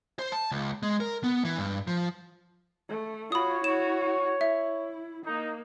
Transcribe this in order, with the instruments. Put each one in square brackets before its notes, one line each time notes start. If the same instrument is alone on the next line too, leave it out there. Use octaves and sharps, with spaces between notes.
[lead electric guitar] C5
A5
C#2
G#3
A#4
B3
E3
G2
F3
[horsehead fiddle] A3
[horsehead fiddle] F4 F#4 [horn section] C#5 [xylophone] B5 D#6
[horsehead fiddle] E4 F#4 [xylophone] E7
[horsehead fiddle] E4 [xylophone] E5
[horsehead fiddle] A#3 [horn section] D#4